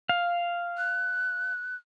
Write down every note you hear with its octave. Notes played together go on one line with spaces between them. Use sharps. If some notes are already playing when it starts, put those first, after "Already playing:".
F5
F#6